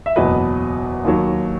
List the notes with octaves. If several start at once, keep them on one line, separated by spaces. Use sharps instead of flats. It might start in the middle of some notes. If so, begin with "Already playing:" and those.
E5
F#1 E2 B2 F#3 B4 D#5
D#2 D#3 F#3